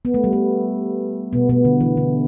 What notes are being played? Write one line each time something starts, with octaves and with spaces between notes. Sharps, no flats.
B3
A3
G3
A3
B2 B3
B2 B3
D3
E3
D3